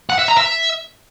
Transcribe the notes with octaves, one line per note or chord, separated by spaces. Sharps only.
F#5
E5
A#5
E5